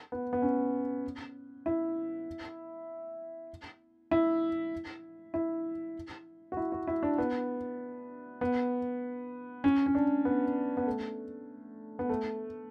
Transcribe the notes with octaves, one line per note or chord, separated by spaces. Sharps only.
B3
B3
C#4
E4
E4
E4
F#4
E4
F#4
E4
D4
B3
B3
C#4
C#4
D4
B3
B3
A3
B3
A3